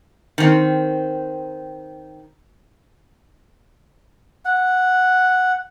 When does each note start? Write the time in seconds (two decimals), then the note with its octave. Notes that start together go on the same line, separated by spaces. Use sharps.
0.38 D#3 C4
4.45 F#5